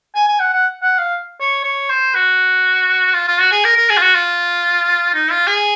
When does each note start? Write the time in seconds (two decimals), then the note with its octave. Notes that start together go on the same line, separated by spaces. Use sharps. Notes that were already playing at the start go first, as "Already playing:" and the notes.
0.15 G#5
0.27 G#5
0.40 F#5
0.53 F#5
0.82 F#5
0.98 F5
1.40 C#5
1.64 C#5
1.90 C5
2.15 F#4
3.14 F4
3.27 F4
3.40 F#4
3.51 G#4
3.64 A#4
3.76 A#4
3.89 G#4
3.97 F4
4.02 F#4
4.15 F4
5.14 D#4
5.31 F4
5.47 G#4